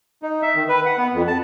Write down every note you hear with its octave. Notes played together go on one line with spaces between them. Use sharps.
D#4
E5
D#3
B4
F#5
B3
F2
A5